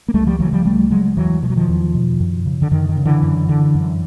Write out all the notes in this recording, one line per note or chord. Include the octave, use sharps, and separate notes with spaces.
A#3
C#2 G3 A3
F3 G3
C#3 E3 F#3
F3 G3
C#2 G3 A3
C#3 F#3 G#3
E2 E3 F#3
B2 F3
F#3
D#3 F3
E2
B2
F#2
C#3
D3
F#2 D#3
D#3
C#3
D3 E3
F#2
D3
F#2